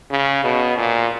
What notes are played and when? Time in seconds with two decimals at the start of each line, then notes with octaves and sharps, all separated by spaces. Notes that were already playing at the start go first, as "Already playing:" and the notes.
0.11 C#3
0.44 B2
0.77 A#2